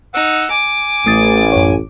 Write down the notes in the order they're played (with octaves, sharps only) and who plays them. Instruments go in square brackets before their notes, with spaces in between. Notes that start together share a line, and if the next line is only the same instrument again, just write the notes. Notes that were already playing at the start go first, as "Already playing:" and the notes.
[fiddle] D#4 [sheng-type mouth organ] F#5 E6
[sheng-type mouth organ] G#5 [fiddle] D6
[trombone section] A1 [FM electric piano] A3 D#6 A6
[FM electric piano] F#2 C#5